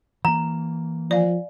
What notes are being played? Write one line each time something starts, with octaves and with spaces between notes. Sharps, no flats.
E3 A#3 A#5
F3 D5 F5 G#5